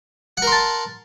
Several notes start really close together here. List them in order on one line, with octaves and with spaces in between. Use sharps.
F#5 A#4 C6 A5